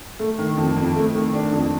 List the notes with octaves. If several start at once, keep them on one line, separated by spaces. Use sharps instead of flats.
A3
D#3
F2
F2
A3
D#3
D4
F2